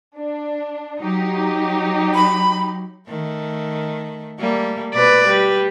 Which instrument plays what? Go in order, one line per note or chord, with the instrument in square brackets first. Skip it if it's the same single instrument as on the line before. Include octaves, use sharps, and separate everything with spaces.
[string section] D4
F#3 D#4 G4
[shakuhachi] B5
[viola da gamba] D#3 A3
G3 A3 A#3
[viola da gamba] B2 [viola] B4 D5
[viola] G3 [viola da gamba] B4